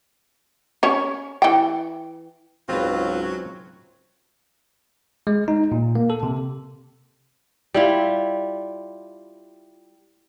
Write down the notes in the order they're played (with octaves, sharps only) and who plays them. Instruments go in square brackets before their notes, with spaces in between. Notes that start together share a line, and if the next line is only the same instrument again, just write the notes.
[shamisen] C#4 C#5
E3 G5
[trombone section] C#2 G#2 [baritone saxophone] F#3 [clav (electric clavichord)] C4 B4 [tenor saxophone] F4
[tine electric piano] G#3
D#4
A#2
A#3
A4
C3
[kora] G3 E4 F4